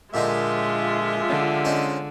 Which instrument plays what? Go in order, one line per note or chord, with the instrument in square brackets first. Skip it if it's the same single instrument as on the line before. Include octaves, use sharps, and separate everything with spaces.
[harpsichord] A#2 D3 D#4 [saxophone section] F3 G4 E5 [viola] G#3 F4
[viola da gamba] D3
[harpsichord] C#4 D#4 C5